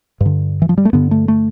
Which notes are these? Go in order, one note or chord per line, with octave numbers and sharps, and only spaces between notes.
G2
D3
E3
F3
G3
A3
G2 D3 B3
A3
A3